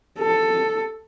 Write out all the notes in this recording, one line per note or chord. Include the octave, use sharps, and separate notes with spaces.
A4